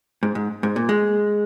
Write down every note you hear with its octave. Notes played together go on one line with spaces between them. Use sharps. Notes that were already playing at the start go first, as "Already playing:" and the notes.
G#2
G#2
G#2
A#2
G#3